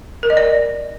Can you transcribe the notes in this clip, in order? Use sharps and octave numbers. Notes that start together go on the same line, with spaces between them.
A#4
D#5
D5